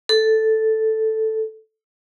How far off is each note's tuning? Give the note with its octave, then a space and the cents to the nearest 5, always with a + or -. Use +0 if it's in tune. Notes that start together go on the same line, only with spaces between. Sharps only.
A4 +0